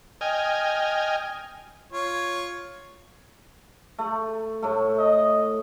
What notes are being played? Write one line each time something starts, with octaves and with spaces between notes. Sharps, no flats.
D#5 G5 G#5 F6
F4 C#5
A3
A2 A3
D#5